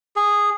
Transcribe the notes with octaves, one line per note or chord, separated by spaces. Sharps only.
G#4